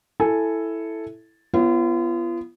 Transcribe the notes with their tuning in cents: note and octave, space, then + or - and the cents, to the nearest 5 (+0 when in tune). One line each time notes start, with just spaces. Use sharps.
E4 +0 A4 +0 G#5 +0
B3 +0 F4 -40 C#5 -15